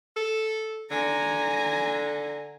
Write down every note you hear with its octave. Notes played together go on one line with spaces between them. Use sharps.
A4
D3 G#5 A#5